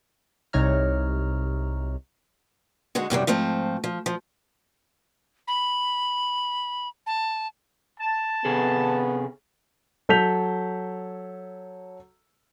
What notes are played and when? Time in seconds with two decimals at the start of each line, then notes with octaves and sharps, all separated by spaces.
0.53 C2 C3 D#4 C#5 A#5 F6
2.95 D3 G#3 D#4 F#4
3.10 F#2 C3 E3 G3
3.27 G#2 F3 A3 C4
3.84 F3
4.06 F3
5.48 B5
7.07 A5
8.00 A5
8.45 C3 B3 G#4 A4
10.09 F#3 A4 G6 B6 F7